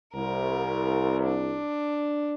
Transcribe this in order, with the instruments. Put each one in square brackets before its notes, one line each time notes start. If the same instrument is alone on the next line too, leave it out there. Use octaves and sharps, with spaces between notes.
[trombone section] C2 [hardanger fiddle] A#4
[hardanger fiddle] D4